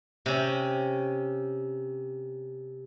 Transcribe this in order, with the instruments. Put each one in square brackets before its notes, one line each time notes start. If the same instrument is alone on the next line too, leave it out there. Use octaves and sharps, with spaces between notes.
[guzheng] C3 C#4